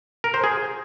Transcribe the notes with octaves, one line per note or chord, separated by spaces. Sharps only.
A#4
C5
G#4